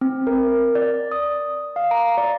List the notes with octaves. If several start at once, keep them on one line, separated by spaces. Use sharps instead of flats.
C4
A#4
D5
D#6
F5
A#5
D5